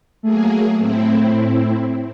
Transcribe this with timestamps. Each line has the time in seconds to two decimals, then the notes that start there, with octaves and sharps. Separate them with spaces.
0.23 F#3 A3 A#3 G#4
0.78 A2 C4 E4